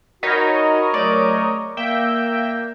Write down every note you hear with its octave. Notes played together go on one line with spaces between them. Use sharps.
D#4 F#4 A#4 C#5 D#5 B5
C#3 F#3 A3 D5
A#3 E5 G5